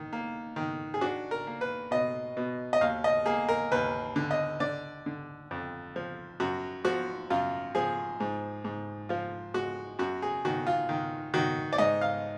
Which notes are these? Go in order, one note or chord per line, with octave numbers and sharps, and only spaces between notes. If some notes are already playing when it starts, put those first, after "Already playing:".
Already playing: D#3
A#3
D#3
G#4
D4 F#4
A#4
A#3
B4
B2 D#5
B2
D#5
D#2 F5
D#5
A#3 G#4
A#4
D#2 B4
D3
D#5
D3 D5
D3
F2
F3
F#2 F#4
F3 F#4
F#2 F4
F3 G#4
G#2
G#2
F3 F4
G#3 F#4
F#2 F#4
G#4
D#3 F#4
F4
D#3
D#3 F#4
D5
G#2 D#5
F5